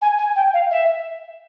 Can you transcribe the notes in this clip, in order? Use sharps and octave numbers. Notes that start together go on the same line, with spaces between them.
G#5
G#5
G5
F5
E5